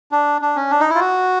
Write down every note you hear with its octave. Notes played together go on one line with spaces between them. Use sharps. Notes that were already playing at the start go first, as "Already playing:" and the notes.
D4
D4
C#4
D4
D#4
E4
F4
F#4